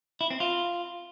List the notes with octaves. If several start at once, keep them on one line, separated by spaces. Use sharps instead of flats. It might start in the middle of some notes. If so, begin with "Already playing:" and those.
E4
C4
F4